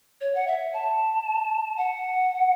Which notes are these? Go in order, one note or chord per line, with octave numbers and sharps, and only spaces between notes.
C#5
F#5
E5
A5
F#5